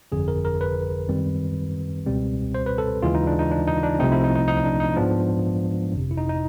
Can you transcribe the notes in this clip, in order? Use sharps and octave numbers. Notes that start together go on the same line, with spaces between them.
G1 F2 D3 G#4
A#4
A#4
B4
F#2 D#3 G3 C4
C#2 B2 G3 C4
C5
B4
A4
D#2 C#3 E3 G#3 F4
D#4
D4
D#4
D4
D#4
D4
C2 C3 F3 A3 C4 D#4
E4
D#4
D#4
D#4
D4
D#4
G#2 F3 G#3 B3 D4
G1 F2 C3
E4
D#4
D#4